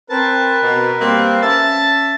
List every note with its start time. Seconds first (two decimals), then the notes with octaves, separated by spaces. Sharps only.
0.10 C4 A#4 B4 A5
0.63 B2
1.00 G3 A#3 C4
1.42 C#4 E5 A5